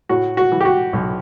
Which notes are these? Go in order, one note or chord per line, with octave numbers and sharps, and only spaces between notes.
A2 F#4
F#4
E3
G4
F#4
B1